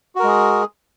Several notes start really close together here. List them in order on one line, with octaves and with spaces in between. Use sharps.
F#4 A#4 G#3 G#4